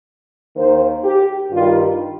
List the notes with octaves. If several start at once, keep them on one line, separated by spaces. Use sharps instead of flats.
D#2 D#3 A#3 C5
G4
G2 D#3 G3 F4